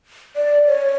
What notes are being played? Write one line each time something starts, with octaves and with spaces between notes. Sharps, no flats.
D5
C#5